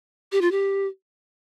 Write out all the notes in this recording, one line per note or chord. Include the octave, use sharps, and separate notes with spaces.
G4
F4
G4